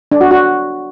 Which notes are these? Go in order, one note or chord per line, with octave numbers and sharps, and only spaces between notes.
D4
F#4
F#4